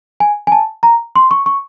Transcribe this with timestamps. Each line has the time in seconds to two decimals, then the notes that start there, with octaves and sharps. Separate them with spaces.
0.20 G#5
0.47 G#5
0.52 A5
0.83 A#5
1.16 C6
1.31 C#6
1.46 C#6